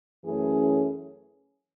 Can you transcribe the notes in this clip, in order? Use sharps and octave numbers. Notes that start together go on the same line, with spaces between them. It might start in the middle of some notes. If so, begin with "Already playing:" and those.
F#2 E3 A3 C#4 G#4